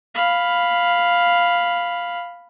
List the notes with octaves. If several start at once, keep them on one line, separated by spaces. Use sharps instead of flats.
F5 B5